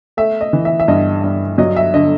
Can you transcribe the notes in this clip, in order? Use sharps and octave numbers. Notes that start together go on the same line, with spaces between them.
A3 E5
D#5
E3
E5
E5
G2 D#5
G2
F#3 D#5
E5
D3 D#5